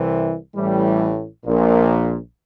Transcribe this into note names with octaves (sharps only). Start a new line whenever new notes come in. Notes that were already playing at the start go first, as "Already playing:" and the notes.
Already playing: C2 C3 E3
A1 A2 E3 G3
A#1 A#2